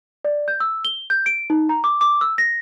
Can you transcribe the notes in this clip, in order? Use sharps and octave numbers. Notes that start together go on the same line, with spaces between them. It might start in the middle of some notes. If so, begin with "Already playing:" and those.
D5
G6
E6
G7
G6
D7
D#4
A#5
D6
D6
E6
A#6